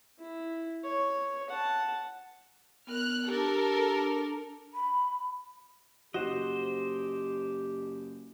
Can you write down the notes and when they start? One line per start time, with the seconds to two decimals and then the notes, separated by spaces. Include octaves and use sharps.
0.19 E4
0.84 C#5
1.50 F#5 A5
2.87 B3 A#4 F6 F#6
3.27 D4 G4 A4 A#4
3.96 D4
4.74 B5
6.14 F#1 F#4 G4 C5 D#5